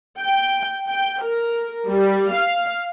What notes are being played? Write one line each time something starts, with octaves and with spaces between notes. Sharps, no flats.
G5
G5
A#4
G3
F5